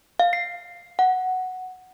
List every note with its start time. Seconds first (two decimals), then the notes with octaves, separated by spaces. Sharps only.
0.20 F5
0.33 C7
0.99 F#5